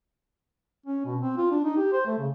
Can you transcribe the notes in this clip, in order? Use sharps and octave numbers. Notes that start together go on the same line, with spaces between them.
C#4
B2
C4
F4
D4
D#4
G4
C5
A3
C#3